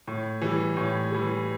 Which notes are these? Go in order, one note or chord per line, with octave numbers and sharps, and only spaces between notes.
A2
E3 G3
A2
E3 G3